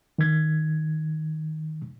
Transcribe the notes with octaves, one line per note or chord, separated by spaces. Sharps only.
D#3 G#6